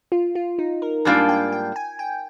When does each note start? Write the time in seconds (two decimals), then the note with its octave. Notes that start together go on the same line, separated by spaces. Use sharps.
0.12 F4
0.35 F4
0.59 D#4
0.82 A#4
1.05 G#2 G3 A#3 D4 F4 G#5
1.29 G5
1.52 G5
1.76 G#5
1.99 G5